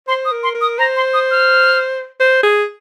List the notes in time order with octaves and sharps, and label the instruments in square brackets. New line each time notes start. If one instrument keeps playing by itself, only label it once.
[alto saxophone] C5 [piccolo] C6
[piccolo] D#6
[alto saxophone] A#4
[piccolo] C6
[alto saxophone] A#4
[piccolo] D#6
[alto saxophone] C5 [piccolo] A#5
[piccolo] C6
D#6
F6
[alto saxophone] C5
G#4